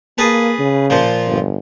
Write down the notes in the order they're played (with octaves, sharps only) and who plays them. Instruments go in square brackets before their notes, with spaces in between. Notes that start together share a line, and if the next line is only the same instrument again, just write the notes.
[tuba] A#3 [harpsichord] G#4 B4 A5
[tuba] C#3
[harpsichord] A#2 F3
[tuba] G1